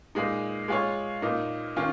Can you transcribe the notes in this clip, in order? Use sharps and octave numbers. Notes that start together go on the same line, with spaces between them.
A#2 G#3 D#4
G#3 F4 C#5
A#2 A#3 D#4
D#3 C#4 F4